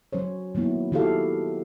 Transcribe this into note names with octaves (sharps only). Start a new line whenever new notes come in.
F#3 C#4 C5 C#5
D#3 F#3 A#3 B3 E4
D#3 E4 F#4 G4 A4 F5